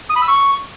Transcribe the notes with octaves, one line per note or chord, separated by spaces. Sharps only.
D#6
B5
E6
C#6